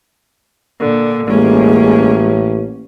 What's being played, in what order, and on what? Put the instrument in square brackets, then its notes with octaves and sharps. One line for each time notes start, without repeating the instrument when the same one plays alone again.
[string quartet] A#2 D3
[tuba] A1 [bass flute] G#3 [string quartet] A#3 C#4